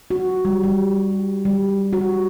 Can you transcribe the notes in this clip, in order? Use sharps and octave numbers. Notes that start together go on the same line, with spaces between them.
F#4
G3
G3
G3
F#4